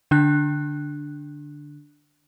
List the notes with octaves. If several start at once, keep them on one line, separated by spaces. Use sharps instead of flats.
D3 D4 F#6